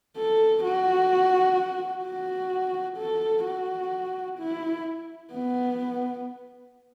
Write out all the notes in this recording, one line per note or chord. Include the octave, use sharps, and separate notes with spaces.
A4
F#4
F#4
A4
F#4
E4
B3